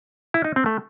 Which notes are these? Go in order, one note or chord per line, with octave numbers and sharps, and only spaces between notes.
E4
D#4
C4
A3